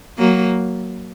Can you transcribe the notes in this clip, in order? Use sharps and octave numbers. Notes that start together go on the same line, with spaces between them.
F#3 A#3